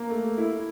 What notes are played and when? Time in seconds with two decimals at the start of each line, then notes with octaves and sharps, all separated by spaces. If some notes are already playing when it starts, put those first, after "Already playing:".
Already playing: A#3
0.10 A3
0.38 E4